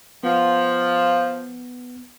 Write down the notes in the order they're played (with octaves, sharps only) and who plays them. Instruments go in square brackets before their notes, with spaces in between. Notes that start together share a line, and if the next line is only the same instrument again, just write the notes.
[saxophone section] F3 [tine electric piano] B3